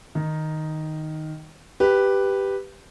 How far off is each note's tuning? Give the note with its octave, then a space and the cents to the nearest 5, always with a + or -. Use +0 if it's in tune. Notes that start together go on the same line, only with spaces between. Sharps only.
D#3 +0 D#4 +0
G4 +0 B4 +0